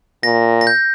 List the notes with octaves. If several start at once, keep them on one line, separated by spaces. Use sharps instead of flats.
A#2 A#6
A#6
G6